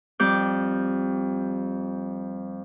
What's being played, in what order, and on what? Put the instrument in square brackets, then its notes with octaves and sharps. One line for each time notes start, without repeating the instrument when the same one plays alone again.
[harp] F2 G3 D6 G6